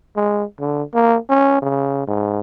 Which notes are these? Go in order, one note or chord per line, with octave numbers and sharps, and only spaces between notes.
G#3
D3
A#3
C#4
C#3
G#2